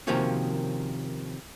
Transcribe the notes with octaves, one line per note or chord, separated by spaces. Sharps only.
C3 D#3 F3 A#3 C#4 F#4